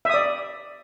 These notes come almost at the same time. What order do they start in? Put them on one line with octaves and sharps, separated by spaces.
E5 D#6 D5